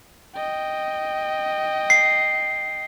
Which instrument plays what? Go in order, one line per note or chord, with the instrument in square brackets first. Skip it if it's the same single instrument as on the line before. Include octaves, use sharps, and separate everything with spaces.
[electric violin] D#5 G5
[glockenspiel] C7